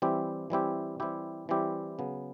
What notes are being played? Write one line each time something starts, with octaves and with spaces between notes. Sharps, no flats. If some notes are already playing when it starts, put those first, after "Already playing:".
E3 G3 C4 E4 G4
E3 G3 C4 E4 G4
E3 G3 C4 E4 G4
E3 G3 C4 E4 G4
C#3 F#3 B3